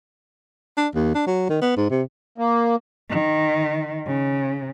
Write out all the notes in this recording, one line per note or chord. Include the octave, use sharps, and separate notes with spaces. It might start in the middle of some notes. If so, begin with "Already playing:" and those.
D4
D#2
D4
F#3
D#3
B3
G#2
C3
A#3
D#3
C#3